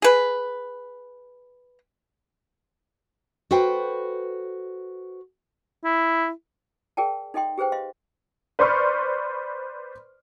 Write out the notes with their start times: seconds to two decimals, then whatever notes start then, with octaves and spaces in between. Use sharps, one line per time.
0.02 G#4 B4
3.51 F#4 A4 B4 C5 G5
5.84 E4
6.97 G#4 A#4 D5 G5 A5
7.34 D#4 A4 D#5 G5 C6
7.58 G4 G#4 B4 C5 G5
7.72 D#5 F5 C6
8.59 B4 C5 D5 C6 C#6 F6